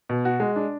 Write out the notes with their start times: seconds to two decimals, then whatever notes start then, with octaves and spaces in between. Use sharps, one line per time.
0.09 B2
0.25 F#4
0.40 G#3
0.56 D4